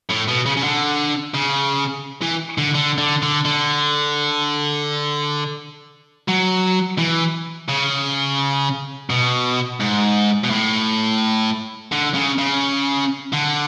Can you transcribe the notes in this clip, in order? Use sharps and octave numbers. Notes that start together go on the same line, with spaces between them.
A2
B2
C#3
C#3
D3
C#3
E3
D3
D3
D3
D3
D3
F#3
E3
C#3
B2
G#2
B2
A2
D3
C#3
C#3
D3